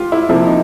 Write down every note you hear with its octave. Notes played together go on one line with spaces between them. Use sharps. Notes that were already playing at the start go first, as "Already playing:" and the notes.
Already playing: F4 G4
E4
C3 F3 A#3 E4
D#4